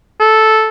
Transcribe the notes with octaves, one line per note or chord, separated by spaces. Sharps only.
A4